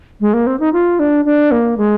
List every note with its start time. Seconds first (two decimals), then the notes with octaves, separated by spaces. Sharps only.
0.21 G#3
0.33 A#3
0.47 C4
0.60 D#4
0.73 F4
0.99 D4
1.25 D4
1.51 A#3
1.77 G#3